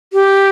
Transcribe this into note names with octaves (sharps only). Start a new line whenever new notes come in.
G4